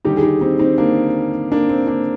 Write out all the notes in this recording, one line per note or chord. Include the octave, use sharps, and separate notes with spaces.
D#2 D3 G3 D#4 G4
G#4
D#4 G4
C4 D#4
C4 D#4
A#3 D4
A#3 D4
C4
A#3 D4